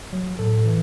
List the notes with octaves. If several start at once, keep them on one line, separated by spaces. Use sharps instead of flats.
F#3
A2 A4
E3